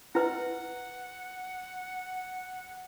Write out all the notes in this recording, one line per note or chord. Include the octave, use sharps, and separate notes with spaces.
E4 B4 D#5 F#5